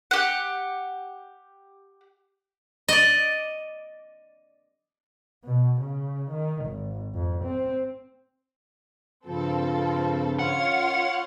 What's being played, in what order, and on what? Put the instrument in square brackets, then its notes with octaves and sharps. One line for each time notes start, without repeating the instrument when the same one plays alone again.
[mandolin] G4 F#5
[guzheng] D5 D#5
[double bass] B2
C#3
D#3
G#1
F2
C4
[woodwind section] G2 C#3 F3 [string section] C4 A4 [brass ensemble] F4
[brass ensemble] D#3 C#4 [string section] F4 C#5 F5 [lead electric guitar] F#5